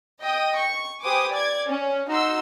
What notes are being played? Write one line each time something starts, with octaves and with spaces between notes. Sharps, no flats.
D#5 G5 D#6
C#6
G4 B4 C5 G#5 D6 D#6
D5 D6 G#6
C#4
D#4 F#4 C6 E6